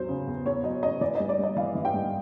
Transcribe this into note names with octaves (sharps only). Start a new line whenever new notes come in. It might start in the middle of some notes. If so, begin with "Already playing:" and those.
Already playing: E2 F#3 C5
C#3
E2
E2 C#5
F#3 D#5
C#3 D#5
E3 D5
D#5
G2
D5
G2 D#5
E3 F5
E3
G5
G2